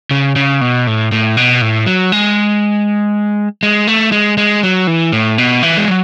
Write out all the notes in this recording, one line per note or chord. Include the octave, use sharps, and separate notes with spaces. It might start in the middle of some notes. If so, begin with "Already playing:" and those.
C#3
C#3
B2
A2
A2
B2
A2
F#3
G#3
G#3
A3
G#3
G#3
F#3
E3
A2
B2
E3
G#3
F#3